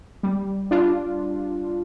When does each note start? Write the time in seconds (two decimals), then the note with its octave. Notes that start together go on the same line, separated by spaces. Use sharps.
0.23 G3
0.71 D4 F4